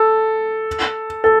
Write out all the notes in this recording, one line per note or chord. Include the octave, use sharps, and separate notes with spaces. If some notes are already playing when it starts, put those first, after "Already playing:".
Already playing: A4
A4